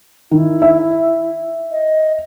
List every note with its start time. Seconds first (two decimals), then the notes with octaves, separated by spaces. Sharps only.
0.31 D#3 E4
0.62 E5
1.71 D#5